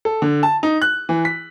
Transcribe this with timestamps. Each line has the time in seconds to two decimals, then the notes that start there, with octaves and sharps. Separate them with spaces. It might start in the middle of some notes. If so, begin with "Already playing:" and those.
0.05 A4
0.22 D3
0.43 A5
0.63 D#4
0.82 F#6
1.09 E3
1.25 B6